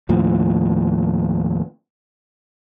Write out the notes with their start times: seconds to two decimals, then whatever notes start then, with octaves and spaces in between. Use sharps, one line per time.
0.09 D#2 A2 F3